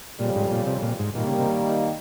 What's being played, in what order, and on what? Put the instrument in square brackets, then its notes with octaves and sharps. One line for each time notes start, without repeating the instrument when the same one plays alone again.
[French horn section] F2 C#3 G3 [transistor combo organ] A#2
[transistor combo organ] G#2
A#2
C3
A#2
G#2
[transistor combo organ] A#2 [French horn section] D#3 G3 A#3
[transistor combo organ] C#3
C3